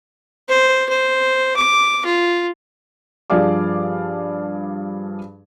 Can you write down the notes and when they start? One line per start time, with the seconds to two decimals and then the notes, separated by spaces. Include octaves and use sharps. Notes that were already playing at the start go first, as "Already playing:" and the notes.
0.48 C5
0.89 C5
1.56 D6
2.05 F4
3.30 G2 F3 G#4 D5 F5 D6